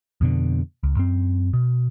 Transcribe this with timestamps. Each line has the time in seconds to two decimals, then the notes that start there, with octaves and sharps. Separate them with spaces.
0.21 F2 B2 D3
0.83 C#2
0.97 F#2 C4
1.53 B2